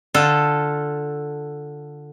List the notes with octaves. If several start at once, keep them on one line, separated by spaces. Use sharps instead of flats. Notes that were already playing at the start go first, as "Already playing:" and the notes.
D3 F4 A4